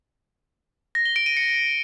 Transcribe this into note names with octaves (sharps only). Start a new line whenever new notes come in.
A#6
G7
D7
D#7
C#7